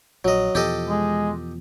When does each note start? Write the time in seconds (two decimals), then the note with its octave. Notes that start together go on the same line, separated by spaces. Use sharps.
0.25 A#1 F#3 D#5
0.55 E2 B2 F3 G4 A4 D#5
0.87 G#3